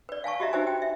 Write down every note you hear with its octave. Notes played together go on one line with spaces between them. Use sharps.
B4 D5
F5 G#5 A5 C#6
F#4 G4 D#5 E5 A#5
D#4 F#4 G4 B4 C5 G#5
G5
E5